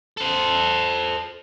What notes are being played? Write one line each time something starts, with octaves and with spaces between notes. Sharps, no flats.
A4 C5